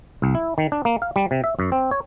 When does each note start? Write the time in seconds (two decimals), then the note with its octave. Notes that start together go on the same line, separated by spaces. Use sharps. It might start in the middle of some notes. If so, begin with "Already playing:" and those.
0.22 C2
0.35 E4
0.58 D#3
0.72 D4
0.85 A#3
1.02 F5
1.16 G3
1.31 C3
1.44 E5
1.59 F#2
1.72 C4
1.91 C#5